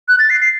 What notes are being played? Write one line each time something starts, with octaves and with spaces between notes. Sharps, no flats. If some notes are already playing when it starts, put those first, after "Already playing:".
F#6
A6
C7
C7